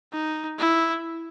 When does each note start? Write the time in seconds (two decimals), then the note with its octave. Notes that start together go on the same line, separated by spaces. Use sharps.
0.12 D#4
0.59 E4